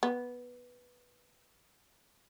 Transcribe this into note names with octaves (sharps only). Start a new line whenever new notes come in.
B3